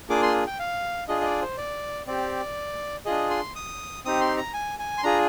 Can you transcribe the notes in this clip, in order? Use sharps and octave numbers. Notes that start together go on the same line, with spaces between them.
A#3 D4 F4 G#4 D6
C6
G5
F5
D4 F4 G#4 D#5
D#5
D5
C5
D5
C4 G4 D5
D4 F4 G#4 D#5
C6
D#6
C4 D#4 G4 D#6
C6
A#5
G#5
G#5
C6
D4 F4 G#4 A#5